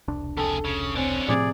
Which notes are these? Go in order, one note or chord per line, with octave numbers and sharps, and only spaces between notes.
E1 C2 D4
F2 G#4 A4
C#3
D3 C4 C#4
A2 C3 F3 G#4 D5